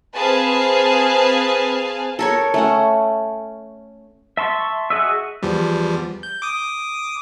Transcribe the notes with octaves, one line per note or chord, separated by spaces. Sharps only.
C4 G#4 B4 F5 G#5 A5
A4 A#4 C#5
A3 C#4 F#5
E5 A5 C6 C#6
F#4 G#4 D#5 E5
E2 F3 G3
G6
D6 D#6